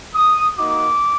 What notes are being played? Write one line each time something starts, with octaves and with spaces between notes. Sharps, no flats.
D#6
A#3 D#4 F#4 D6